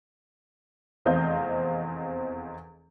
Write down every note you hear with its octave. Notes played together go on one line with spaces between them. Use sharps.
F1 E2 C4 D#5 F5 G6